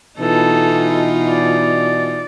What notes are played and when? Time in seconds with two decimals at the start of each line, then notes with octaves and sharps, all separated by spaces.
0.20 B2 E3 D#4 F4 A4
1.31 D5